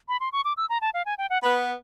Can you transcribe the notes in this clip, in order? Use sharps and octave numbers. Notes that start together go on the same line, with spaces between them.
B5
C6
C#6
D6
E6
A#5
A5
F5
G#5
G5
F#5
B3 B5